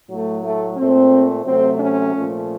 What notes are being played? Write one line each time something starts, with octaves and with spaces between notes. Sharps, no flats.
A2 F#3 A3
A3
A#2 A3 C4
C3 F#3 A3 C4
C#4
A#2 F3 A3